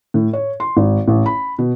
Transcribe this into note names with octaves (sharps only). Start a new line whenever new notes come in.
A2
C#5
C6
G#1
A1
B5
B2